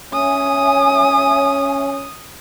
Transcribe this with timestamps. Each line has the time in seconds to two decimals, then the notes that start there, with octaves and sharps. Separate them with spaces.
0.14 C#4 C#5 E5 G#5 D#6